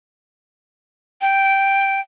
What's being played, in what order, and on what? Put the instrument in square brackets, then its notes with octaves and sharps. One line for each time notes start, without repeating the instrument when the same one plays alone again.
[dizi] G5